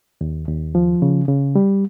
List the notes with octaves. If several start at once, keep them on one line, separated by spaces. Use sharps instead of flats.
D#2
D#2
F3
C#3
C#3
G3